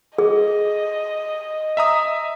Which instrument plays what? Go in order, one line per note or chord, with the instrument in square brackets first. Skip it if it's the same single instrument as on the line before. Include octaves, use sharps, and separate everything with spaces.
[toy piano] G#4 [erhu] D#5
[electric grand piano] E5 A#5 D#6